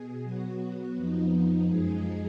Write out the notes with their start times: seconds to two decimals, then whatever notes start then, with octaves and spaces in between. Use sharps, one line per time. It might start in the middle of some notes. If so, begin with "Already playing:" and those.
Already playing: B2 G#4
0.23 F#3 B3 F#4
0.95 F2 F3 B3 D#4
1.67 F#2 F3 G#3 D#4 G#4